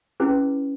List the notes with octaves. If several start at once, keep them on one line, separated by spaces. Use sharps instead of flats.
C#4 E4 G#4 B4